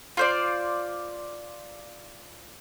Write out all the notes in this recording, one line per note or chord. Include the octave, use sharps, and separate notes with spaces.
F4 C5 D5